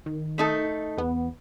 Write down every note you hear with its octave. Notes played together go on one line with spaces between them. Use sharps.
D#3
A3 D#4 A4
E2 B3